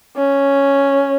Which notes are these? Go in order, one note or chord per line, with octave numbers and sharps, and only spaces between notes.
C#4